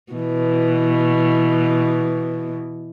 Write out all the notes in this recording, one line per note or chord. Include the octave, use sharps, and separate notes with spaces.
B2 E3